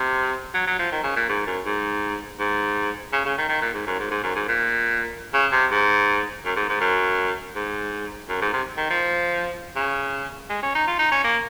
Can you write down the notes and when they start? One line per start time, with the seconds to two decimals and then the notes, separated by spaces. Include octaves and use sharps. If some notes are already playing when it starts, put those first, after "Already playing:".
Already playing: C3
0.54 F#3
0.67 F#3
0.79 F3
0.92 D#3
1.04 C#3
1.16 A#2
1.29 G#2
1.47 F#2
1.66 G#2
2.40 G#2
3.13 C#3
3.25 C#3
3.38 D#3
3.49 D#3
3.61 A#2
3.74 G#2
3.87 F#2
3.99 G#2
4.11 G#2
4.23 F#2
4.36 G#2
4.48 A#2
5.34 C#3
5.52 C3
5.71 G#2
6.45 F#2
6.56 G#2
6.69 G#2
6.81 F#2
7.55 G#2
8.29 F#2
8.41 G#2
8.53 C3
8.77 D#3
8.90 F3
9.76 C#3
10.50 G#3
10.63 C#4
10.75 D#4
10.87 F4
10.99 D#4
11.12 C#4
11.24 A#3